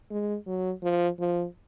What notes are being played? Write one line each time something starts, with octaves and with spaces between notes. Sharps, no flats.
G#3
F#3
F3
F3